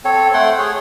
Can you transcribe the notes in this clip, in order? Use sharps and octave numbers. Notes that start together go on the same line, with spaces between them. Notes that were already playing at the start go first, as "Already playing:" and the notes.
C4 A4 C#5
A3 F#5 G5 C6
G#4 C#5